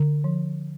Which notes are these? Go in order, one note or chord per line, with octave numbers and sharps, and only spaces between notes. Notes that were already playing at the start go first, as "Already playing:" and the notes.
Already playing: D3
F3